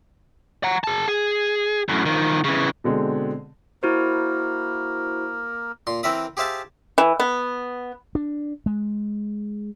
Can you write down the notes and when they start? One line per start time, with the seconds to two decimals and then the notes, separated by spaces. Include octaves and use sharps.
0.64 F#5 A#5
0.84 G#4 A5
1.08 G#4
1.89 F#2 A2
2.06 D#3 F3
2.44 C#3 E3
2.84 B2 D3 G#3 C4
3.83 A#3 E4 F#4 A#4 C5
5.87 A#2 C6
6.03 E3 C4 A#4 E5 B5 D#6
6.37 G4 G#4 C5 E5 F5 A5
6.98 E3
7.20 B3
8.15 D4
8.66 G#3